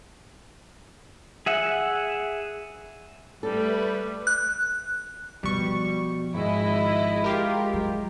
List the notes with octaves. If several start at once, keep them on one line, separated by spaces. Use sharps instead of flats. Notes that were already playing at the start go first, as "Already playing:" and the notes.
G#4 E5 F#5
G3 A3 A4 B4
F#6
B2 F3 G3 C#6
G#1 G#3 E4 D#5
F4 G4 A#4
F#3